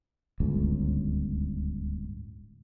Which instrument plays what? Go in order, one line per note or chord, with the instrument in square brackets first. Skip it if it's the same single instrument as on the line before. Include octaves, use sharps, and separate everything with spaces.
[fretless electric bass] D1 G1 C#2